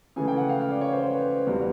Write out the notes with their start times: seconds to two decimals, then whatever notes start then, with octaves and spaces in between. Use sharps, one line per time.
0.16 C#3 E3 A3 G#5
0.28 G5
0.37 F#5
0.49 F5
0.60 F5
0.70 D5
0.81 C#5
0.92 C5
1.03 C5
1.14 B4
1.46 E2 B2 G3 C4